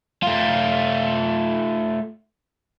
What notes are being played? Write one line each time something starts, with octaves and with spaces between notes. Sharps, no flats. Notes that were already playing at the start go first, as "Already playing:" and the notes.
A3 F4